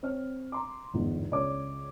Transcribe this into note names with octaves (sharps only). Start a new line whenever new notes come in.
C4 C#5 F6
A#5 C6 D6
G1 E2 G#2
C#2 C#5 D5 D6